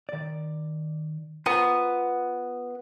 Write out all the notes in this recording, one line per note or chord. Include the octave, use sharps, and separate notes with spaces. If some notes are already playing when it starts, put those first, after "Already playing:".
D#3 D5
B3 F4 C5 A#5